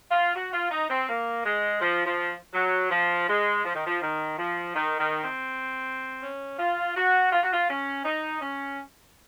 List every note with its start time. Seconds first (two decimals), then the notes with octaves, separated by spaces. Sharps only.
0.10 F4
0.34 F#4
0.53 F4
0.70 D#4
0.89 C4
1.08 A#3
1.44 G#3
1.81 F3
2.06 F3
2.54 F#3
2.91 F3
3.28 G#3
3.64 F3
3.74 D#3
3.85 F3
4.01 D#3
4.37 F3
4.75 D#3
4.98 D#3
5.24 C4
6.21 C#4
6.59 F4
6.95 F#4
7.32 F4
7.43 F#4
7.53 F4
7.69 C#4
8.05 D#4
8.41 C#4